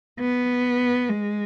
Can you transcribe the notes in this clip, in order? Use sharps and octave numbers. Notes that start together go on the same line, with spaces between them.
B3
G#3